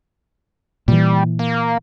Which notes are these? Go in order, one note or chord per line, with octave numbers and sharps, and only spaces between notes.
A#2 E3 G3
A#3